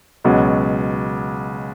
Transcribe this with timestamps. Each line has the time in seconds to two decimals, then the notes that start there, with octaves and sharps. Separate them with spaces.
0.24 C#2 B2 F#3